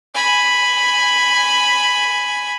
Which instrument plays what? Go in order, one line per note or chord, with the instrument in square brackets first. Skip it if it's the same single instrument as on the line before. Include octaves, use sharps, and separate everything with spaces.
[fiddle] G#5 B5